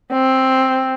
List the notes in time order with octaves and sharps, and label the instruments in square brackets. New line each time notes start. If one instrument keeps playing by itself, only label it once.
[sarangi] C4